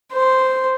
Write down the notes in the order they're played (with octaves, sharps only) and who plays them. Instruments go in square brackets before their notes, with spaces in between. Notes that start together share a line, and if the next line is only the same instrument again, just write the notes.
[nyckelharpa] C5